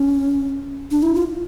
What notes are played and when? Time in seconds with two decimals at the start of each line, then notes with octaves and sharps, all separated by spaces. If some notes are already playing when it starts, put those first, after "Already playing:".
Already playing: C#4
0.91 D4
1.03 E4
1.15 F4